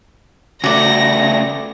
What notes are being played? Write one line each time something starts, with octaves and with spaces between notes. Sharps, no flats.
C#3 A3 F#4 D5 A#6